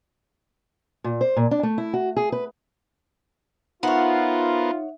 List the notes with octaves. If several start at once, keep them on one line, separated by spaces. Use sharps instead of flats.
A#2
C5
A#2
D4
A3
E4
F#4
G#4
B4
B3 D#4 F4 A#4 C5 C#5 E5 F#5